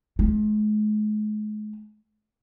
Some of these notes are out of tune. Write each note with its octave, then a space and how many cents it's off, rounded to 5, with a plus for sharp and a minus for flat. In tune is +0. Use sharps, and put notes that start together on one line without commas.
G#3 +40